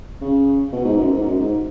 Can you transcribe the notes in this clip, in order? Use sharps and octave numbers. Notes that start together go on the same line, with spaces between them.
C#3
B2
G#2
F#2
G#2
F#2
G#2